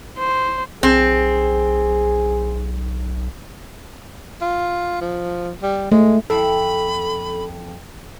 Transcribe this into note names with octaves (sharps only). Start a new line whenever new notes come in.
C5
B1 C4 G#4
F4
F3
G3
G#3 A3
F2 E4 A4 B5